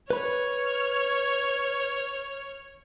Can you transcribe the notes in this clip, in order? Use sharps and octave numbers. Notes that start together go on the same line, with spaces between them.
B4 C#5 B5 F6